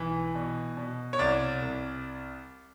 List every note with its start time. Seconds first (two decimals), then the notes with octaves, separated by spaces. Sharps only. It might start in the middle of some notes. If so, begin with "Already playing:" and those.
Already playing: B1 E3
0.35 B2
0.77 B2
1.13 C#5
1.19 C2 D5
1.62 C2